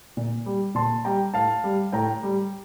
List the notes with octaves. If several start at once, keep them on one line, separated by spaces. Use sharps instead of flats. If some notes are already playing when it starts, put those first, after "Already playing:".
A#2
G3
A#2 A5 C6
G3 G5 A#5
A2 F5 A5
G3
A2 G5 A#5
G3